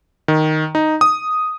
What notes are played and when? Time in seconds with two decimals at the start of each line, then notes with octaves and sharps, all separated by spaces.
0.28 D#3
0.75 D#4
1.01 D#6